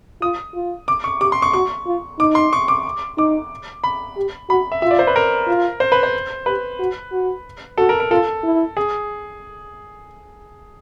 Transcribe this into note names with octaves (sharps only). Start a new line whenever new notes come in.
F4 D#6
F4
D6
C#6
G4 D6
C6
C#6
F#4 C#6
F4
D#4 D6
C6
C#6
D6
D#4 D6
B5
G4
F#4 B5
E5
F4 E5
D5
C5
B4
A#4
F4
C5
B4
C5
G4 B4
F#4
F#4
F#4 A4
A#4
A#4
F4 A4
E4
G#4